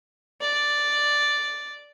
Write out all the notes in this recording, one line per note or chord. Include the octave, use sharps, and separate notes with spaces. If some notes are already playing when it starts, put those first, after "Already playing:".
D5